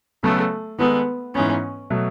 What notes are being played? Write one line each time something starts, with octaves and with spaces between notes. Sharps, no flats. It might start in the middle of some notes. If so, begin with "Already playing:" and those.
C#3 F#3 A3 B3 F#4 A4
D#3 G#3 B3 D#4 A4
G#2 E3 B3 C#4
B2 F#3 A3